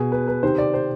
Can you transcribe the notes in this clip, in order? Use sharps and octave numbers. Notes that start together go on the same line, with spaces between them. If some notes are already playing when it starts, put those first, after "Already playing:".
Already playing: B2 G#4
B4
B4
C3 D#3 C5
D5
C5